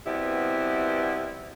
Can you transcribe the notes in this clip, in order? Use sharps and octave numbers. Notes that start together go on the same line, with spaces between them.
B2 G3 B3 C4 E4